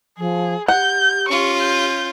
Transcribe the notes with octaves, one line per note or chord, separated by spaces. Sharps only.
F3 G#4
G4 F#5 G6
C#4 F4 C#6
G6